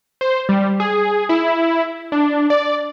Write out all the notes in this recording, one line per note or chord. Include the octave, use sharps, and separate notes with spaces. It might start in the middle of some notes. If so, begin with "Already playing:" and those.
C5
G3
G#4
E4
D4
D5